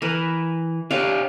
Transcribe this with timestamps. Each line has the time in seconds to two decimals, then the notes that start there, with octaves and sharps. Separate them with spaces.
0.02 E3 A#4 B4
0.91 D4 G4 C#5 F5